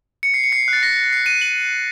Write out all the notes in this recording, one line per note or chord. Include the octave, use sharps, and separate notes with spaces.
C#7
C7
C#7
C7
C7
F#6
A6
A#6
C7
D#7
F#7